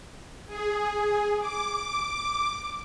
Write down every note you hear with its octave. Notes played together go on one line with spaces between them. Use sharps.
G#4
D6